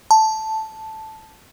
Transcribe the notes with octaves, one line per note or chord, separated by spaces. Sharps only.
A5